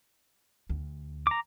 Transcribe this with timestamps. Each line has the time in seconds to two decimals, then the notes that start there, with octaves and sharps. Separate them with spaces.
0.69 D2
1.27 A#5 D6